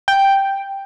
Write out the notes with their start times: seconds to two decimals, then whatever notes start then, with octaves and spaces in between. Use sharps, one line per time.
0.08 G5